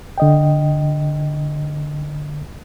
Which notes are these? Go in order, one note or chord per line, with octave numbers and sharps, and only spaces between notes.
D3 D#5 G5